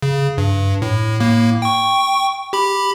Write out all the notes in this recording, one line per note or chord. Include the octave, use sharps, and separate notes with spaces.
C#3
G2
A2
A2 A#3
G5 C#6
G4 B5